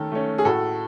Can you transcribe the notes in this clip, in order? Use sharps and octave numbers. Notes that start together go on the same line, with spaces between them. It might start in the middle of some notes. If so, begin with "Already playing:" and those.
Already playing: D#3 A3 C#4 A4
A3 C#4
G#4
A2 F#4 A4